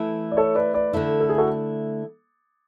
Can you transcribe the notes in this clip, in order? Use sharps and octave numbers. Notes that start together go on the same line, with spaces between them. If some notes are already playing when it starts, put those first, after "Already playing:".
Already playing: E3 A3 E4
D5
A4 C#5
B4 D5
B4 D5
D3 A3 E4
A4
G#4
F#4 A4